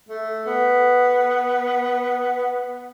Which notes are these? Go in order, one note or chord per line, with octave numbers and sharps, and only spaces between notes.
A3
B3